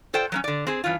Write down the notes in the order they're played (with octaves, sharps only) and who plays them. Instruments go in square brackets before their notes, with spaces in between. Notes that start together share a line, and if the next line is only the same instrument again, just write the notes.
[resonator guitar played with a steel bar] F4 A4 C5 D5 G5
F#3 A#3 C#4
D3 D5
C4 G#4
G2 E3 C#4 F4